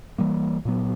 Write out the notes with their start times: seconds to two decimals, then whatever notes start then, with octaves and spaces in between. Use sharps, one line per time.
0.18 E3 G3 A#3
0.65 A#2 F#3 B3